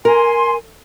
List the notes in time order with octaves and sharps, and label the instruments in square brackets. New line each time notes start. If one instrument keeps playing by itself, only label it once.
[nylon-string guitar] A#4 [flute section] G#5 C6